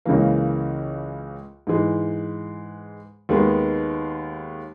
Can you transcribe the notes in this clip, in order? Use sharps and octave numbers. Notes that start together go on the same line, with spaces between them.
C#2 C#3 E3 A#3
G#2 E3 G#3
D#2 D#3 G#3 B3